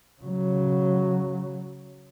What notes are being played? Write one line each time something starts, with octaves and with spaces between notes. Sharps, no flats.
C#3 F#3